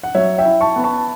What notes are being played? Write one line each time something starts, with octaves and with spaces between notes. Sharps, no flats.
F#5
F#3 C#5 E5
E5 G5
E4
A5 C#6
B3
A5 C#6